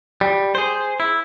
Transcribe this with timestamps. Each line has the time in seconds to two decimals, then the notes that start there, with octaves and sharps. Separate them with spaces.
0.21 G3
0.55 G#4 C5
1.00 E4